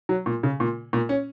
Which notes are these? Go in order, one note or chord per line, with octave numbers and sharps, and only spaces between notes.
F#3
A#2
C#3
A#2
A#2
C#4